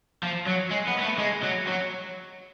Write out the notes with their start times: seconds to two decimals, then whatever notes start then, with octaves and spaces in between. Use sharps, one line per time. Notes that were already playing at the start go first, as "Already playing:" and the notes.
0.23 F3
0.46 F#3
0.71 G#3
0.87 B3
0.99 B3
1.03 A3
1.19 G#3
1.43 F#3
1.67 F#3